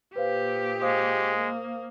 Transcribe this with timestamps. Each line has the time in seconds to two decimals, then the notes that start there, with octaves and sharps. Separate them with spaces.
0.16 A#2 G4 B4 C5 F5
0.82 G#3 C5 F5 D#6
1.38 A#3